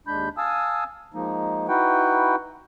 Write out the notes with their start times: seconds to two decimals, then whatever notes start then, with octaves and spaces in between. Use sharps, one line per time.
0.07 D#2 G#3 D4 B5 G6
0.37 F5 G#5 A5 D#6 E6
1.14 F3 G#3 A#3 D#4
1.68 D#4 E4 F#4 B4 F#5 G5